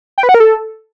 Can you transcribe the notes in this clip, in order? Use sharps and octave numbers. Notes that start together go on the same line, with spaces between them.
G5
B4
F#5
A#4
A4